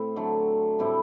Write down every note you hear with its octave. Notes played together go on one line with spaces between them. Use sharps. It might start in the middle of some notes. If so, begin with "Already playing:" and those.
Already playing: A2 C4 E4
D3 F#3 A3
A2 G3 C4 E4